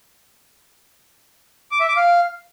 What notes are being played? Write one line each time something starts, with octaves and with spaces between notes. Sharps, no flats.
D6
E5
D6
F5